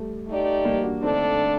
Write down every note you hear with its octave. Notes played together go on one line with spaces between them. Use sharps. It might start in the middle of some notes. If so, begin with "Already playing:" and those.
Already playing: G3 A3
A3 D#4 G4 D5
G3 A#3
D4 F#4
D3 A3 C4 D4 D#4 A4 D5